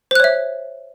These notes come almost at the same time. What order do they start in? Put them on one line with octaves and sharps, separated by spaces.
C5 F#6 C#5 E5